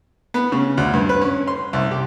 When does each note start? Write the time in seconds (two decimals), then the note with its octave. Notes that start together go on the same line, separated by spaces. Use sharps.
0.34 B3
0.52 C#3
0.77 D2
0.94 G2
1.09 B4
1.21 C#4
1.47 C6
1.73 C2
1.91 G4